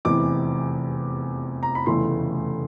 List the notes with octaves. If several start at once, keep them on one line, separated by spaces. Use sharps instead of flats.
F1 E2 C3 E3 D6
A#5
B5
F1 E2 C#3 E3 A3 C6